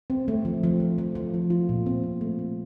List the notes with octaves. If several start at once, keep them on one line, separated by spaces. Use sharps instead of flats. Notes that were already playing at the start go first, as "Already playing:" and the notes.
C4
A3
F3
F3
F3
F3
F3
F3
F4
A#2
C4
C4
A3
A3